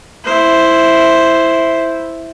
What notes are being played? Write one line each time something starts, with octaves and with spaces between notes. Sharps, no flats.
E4 C5